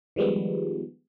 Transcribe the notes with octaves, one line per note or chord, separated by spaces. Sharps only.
D#3 F3 G3 G#3 B3